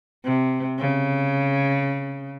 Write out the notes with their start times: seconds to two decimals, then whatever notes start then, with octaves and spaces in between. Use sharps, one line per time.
0.24 C3
0.78 C#3